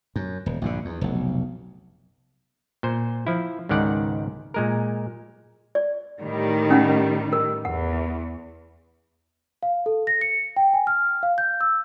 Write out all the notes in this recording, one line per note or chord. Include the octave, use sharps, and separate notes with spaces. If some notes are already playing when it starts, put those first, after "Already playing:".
F#2
D#1
A#1 G2 A#2 D3
E2
F1 B1
A#2 C5
F3 E4
C#2 G#2 D#3 D5 F#5
A#2 G#3 A#4
D5
A2 D#3 G3
C#4 D#4 F#5
A#4
E2 F#5
F5
A4
A#6
C#7
G5
G#5
F6
F5
G6
E6